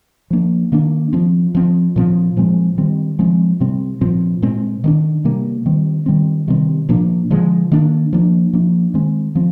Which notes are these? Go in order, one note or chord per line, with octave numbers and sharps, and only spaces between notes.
F3 A#3 D4
D#3 A#3 D4
F3 C4
F3 C4
A#2 F3 C4
A#2 F3 G#3 C4
D#3 G3 C4
F3 G#3 C4
C3 G3 C4
A#2 F3 C4
A#2 G#3 C4
D#3 A#3 D4
C3 G3 A#3
D#3 G3 C4
D#3 G3 C4
C3 D#3 G3 C4
A#2 F3 A#3 D4
D3 F3 G#3
D#3 A#3 D4
F3 A#3 D4
F3 A#3 D4
D#3 G#3 C4
F3 C4